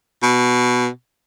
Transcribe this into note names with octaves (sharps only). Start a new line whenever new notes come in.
B2